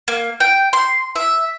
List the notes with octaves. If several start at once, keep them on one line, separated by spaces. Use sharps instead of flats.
A#3
G5
C6
E5